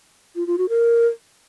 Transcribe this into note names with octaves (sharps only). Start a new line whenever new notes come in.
F4
F4
F#4
A#4